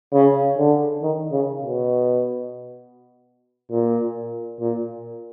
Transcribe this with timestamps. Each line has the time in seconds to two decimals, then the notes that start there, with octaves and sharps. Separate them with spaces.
0.13 C#3
0.58 D3
1.02 D#3
1.32 C#3
1.62 B2
3.71 A#2
4.60 A#2